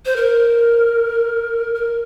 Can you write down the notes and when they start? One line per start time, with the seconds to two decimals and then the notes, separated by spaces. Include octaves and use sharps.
0.06 C5
0.16 A#4
1.75 A#4